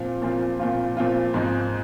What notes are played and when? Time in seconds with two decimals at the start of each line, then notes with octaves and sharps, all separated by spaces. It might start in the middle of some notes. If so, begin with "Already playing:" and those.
Already playing: A#2 F3 C4 F4
0.22 A#2 F3 C4 F4
0.59 A#2 F3 C4 F4
0.97 A#2 F3 C4 F4
1.34 G#2 F3 C4 D#4